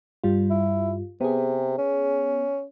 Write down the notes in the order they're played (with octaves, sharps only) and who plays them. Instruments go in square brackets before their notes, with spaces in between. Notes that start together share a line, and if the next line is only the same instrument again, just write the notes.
[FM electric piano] G2 G3 F4
[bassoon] E4
[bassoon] C3 [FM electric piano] B3 G#4
[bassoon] C#4